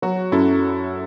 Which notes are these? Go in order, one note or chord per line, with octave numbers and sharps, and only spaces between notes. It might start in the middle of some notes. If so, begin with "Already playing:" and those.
F#3 F#4
F#2 E4 A4